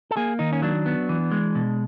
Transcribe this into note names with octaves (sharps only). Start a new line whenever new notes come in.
A4
A#3 G#4
D#3 D#4
C#4
F#3 D4
B3
E3
G#3
B2